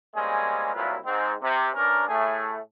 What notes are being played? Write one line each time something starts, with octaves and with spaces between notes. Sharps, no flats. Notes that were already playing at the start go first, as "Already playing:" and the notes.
G3 G#3 A#3 C4 C#4 G#4
C2 A#2 F#3 E4 F4 B4
G#2 C4
C3
G2 C#4 D4 A#4
A2 A3 G#4